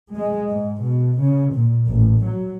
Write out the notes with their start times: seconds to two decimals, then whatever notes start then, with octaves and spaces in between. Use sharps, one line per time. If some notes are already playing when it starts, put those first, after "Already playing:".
0.12 G#3
0.50 G#2
0.81 B2
1.22 C#3
1.54 A#2
1.87 A1
2.27 F#3